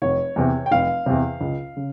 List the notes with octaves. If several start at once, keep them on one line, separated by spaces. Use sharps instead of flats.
F1 C#5
E2 C3
G5
F1 F5
E2 C3
C#2
C#3